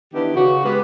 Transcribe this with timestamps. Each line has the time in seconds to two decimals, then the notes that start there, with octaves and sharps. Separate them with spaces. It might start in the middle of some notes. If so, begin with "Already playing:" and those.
0.14 D#3 E3 B3 D4 G4
0.35 C#3 F#4
0.64 G#3 B3 G4 B4